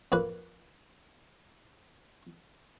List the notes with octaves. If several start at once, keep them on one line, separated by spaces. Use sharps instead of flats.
F2 A#3 B4